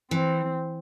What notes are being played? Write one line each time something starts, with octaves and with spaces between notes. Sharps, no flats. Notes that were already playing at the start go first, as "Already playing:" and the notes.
E3 C4